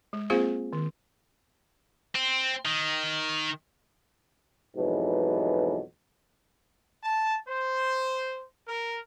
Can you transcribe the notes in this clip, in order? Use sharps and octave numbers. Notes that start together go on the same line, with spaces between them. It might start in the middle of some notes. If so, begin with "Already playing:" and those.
G#3
A#3 C4 F4 G#4 C5 F5
D#3
C4
D#3
F2 G#2 B2 E3 F#3
A5
C5
A#4